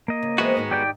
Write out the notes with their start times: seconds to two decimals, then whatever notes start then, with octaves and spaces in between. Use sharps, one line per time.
0.08 A#3 D#5
0.23 C#3
0.38 E3 G#3 B3 C4 F#4 E5
0.55 D#2 G#2 D#4
0.71 G4 D5 G5